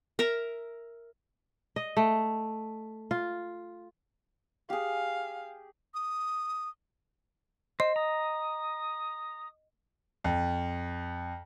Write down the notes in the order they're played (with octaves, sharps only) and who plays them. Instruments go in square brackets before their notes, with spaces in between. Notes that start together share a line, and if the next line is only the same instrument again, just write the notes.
[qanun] A#4 E5 A#5
[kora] D#5
A3
F4
[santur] G4 G#4 [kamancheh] F5
[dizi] D#6
[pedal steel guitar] C5 [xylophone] D#5
[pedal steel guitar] A#5 [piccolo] D#6
[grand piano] F2